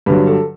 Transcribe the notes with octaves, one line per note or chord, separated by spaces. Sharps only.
G2 D3 F#3 B4
A4